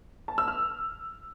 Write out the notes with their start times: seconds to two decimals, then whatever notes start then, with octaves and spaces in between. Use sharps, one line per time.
0.28 A5
0.38 E6
0.48 F6